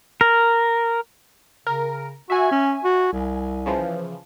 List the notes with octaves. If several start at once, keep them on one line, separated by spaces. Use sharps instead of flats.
A#4
C#3 A#4
F#4 E5 G#5
C#4
F#4
C2
C#3 E3 F3